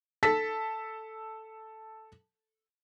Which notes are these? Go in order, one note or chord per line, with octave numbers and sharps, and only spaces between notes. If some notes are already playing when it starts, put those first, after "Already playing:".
A4 A5 B6